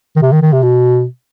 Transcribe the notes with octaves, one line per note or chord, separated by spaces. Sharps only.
D#3
C3
D#3
D#3
C3
B2